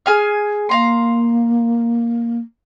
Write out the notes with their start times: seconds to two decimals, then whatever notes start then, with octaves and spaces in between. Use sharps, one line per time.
0.06 G#4 G#5 F6
0.69 A#3 F5 A#5 C6